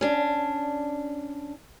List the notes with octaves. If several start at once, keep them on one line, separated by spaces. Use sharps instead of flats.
C#4 D4